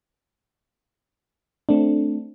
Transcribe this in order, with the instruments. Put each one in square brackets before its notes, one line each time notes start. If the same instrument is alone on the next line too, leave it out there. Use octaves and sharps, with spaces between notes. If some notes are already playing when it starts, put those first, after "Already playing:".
[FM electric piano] A3 C4 D4